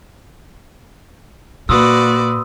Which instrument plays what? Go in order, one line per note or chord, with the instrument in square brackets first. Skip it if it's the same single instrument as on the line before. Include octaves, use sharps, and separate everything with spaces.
[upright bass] A#2 [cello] A#3 [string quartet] F#4 B4 D5 [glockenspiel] C6 D#6 E6